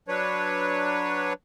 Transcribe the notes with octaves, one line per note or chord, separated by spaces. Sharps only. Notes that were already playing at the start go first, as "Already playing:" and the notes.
F#3 D4 B4 C#5